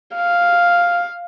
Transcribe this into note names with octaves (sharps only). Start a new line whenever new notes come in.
F5